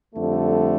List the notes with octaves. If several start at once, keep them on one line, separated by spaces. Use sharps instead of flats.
F2 D3 G3 A3